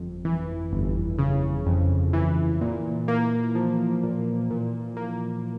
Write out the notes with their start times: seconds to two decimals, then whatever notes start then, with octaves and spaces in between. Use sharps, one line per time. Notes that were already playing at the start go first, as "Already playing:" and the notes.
Already playing: G1 F2
0.25 E3
0.72 G1
1.19 C#3
1.66 F2
2.13 E3
2.61 A#2
3.08 A#3
3.55 F3
4.03 A#2
4.50 A#2
4.97 A#3